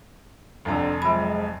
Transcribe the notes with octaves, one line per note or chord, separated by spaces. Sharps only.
F1 F2 D3 A#5
F3 F#3 G#3 B5